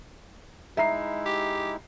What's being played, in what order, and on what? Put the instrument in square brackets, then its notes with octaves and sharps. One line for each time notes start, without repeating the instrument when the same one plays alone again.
[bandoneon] G#3 D#4 E4 [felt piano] E5 A#5 C7
[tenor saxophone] G4